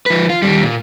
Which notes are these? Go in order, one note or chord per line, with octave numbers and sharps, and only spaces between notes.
F3 B4
F4
D#2 G3
A#2